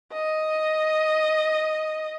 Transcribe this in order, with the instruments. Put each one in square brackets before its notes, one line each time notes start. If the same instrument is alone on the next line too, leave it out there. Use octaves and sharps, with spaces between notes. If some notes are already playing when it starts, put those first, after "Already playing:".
[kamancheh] D#5